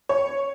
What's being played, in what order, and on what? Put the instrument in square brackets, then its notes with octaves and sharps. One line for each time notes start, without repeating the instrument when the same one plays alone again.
[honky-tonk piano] C#5